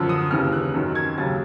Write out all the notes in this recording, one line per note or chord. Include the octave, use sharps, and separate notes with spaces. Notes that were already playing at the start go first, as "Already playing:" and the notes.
Already playing: F#2 D3 F3 E6
D#6
D#2 C#3 E3 F6
F#6
F#2 D#3 F#3
G#6
D#2 C#3 F#3 A6